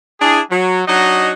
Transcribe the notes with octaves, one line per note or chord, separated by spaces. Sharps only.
D4 E4 G#4
F#3
F#3 D4 D#4 F#4 D#5